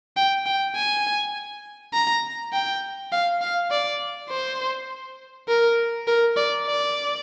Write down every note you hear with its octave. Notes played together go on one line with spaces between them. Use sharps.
G5
G5
G#5
A#5
G5
F5
F5
D5
C5
A#4
A#4
D5
D5